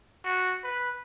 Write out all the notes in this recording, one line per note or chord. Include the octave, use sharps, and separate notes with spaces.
F#4
B4